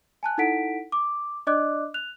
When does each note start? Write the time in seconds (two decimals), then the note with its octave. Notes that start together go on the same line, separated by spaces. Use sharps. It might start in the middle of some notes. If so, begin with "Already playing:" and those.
0.23 G#5 A5 F#6
0.38 D#4 E4 A4 F#5 B6 D7
0.92 D6
1.47 D4 D5 D#5 D6 F#6
1.94 F#6 F7